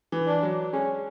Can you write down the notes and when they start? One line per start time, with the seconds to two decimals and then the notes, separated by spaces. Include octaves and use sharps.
0.12 E3
0.27 D4
0.43 F#3
0.73 G#3 C#4